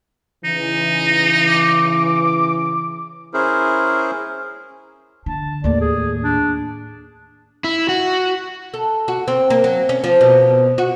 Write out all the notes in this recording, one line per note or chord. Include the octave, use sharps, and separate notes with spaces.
C#3 E3 D#4
D6
C#4 E4 G#4 A#4 C5
D3 A5
D#2 A2 D5
G#4
D4
E4
F#4
A4
F#4
C4
A#3
F#3
C#4
F3
B2
F#4